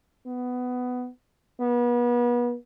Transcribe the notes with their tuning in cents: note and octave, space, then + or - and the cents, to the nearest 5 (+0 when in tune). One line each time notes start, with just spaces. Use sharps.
B3 +15
B3 -35